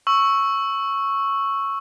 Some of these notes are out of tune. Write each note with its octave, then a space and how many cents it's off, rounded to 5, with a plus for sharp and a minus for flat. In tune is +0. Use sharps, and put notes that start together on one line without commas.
C#6 -5 E6 +0